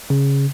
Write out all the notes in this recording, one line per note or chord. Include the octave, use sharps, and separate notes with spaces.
C#3